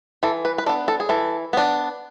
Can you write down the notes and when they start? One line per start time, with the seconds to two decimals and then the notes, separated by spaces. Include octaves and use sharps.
0.23 E3 A4
0.45 B4
0.58 B4
0.66 D4 A4
0.69 B3
0.88 A4
1.00 G#4
1.09 E3 A4
1.53 B3 D4